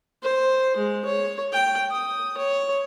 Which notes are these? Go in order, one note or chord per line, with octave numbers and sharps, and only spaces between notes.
C5
G#3
C#5
G5
D#6
C#5